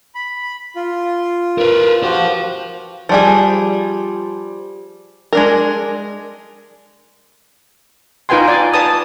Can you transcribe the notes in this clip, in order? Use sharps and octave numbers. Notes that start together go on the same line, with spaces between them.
B5
F4
F4 A#4 B4
F#4 G4 C5 F5
F3 G3 G#4
G#3 D4 A#4
D#4 F4 B4 G5 G#5 C6
D5 G#5
B4 A5 D#6